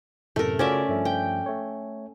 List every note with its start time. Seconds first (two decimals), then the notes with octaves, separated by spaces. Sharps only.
0.36 F#2 A2 C3 A3 A#4
0.59 C#3 C#4 F4 F#4 D5 E5
0.89 G2 F3 A3
1.05 G5
1.46 A3 C#5